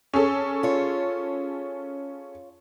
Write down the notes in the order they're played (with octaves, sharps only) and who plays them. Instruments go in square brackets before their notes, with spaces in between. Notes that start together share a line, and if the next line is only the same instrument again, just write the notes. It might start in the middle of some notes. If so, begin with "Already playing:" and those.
[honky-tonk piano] C#4 G#4 A4
[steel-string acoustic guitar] F4 C#5